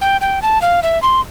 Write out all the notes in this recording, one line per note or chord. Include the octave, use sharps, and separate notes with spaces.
G5
G5
A5
F5
E5
C6